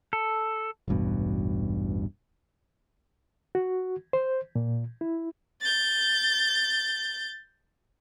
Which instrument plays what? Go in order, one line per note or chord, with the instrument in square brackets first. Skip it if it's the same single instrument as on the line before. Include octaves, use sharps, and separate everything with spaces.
[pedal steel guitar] A4
[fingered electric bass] E1 A1 G2 B2
[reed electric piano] F#4
C5
A#2
E4
[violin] G6 A6